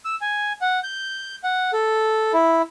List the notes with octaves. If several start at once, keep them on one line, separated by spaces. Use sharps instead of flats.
E6
G#5
F#5
G6
F#5
A4
E4